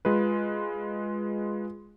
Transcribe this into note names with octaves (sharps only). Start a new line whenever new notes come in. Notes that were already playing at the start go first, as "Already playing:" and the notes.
G#3 F4 B4